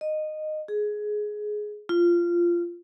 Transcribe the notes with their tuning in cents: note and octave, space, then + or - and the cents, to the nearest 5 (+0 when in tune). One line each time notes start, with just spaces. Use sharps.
D#5 -15
G#4 +15
F4 -15